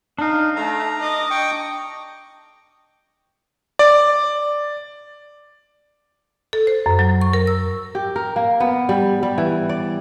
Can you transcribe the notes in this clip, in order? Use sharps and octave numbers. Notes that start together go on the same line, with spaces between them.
D4 D#4 F5
A3 A#5
D#5 D6
G5 C#6
D5
A4
C5
F#2
F#3
C#6
A#4
E6
G4
A#4
A#3
B3
G3
G3
E3
D5